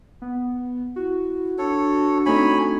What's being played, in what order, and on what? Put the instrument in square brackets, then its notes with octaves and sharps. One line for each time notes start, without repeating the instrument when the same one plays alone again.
[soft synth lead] B3
[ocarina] E4 [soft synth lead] F#4
[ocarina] D4 [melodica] A4 C#5
[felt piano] A3 C4 D#4 [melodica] C#5 G#5 B5